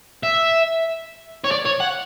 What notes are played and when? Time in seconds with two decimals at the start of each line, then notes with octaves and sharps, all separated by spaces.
0.23 E5
1.44 C#5
1.51 D5
1.65 C#5
1.80 F#5